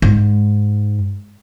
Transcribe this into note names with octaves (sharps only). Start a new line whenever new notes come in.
G#2